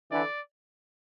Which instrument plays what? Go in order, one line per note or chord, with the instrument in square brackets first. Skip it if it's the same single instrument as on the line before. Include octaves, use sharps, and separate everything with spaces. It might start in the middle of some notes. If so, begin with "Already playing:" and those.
[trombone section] D3 E3 [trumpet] D5